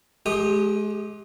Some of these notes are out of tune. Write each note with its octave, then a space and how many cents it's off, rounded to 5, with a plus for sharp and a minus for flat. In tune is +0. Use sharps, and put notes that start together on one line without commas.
G#3 +35 G4 +0 D#6 -15